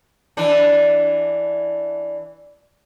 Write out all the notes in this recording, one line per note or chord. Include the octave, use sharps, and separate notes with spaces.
E3 D4